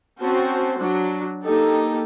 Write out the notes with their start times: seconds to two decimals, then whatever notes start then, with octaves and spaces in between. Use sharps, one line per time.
0.21 C4 C#4 F#4 C5 A5
0.77 F#3 D4
1.43 A#3 D#4 G4 A4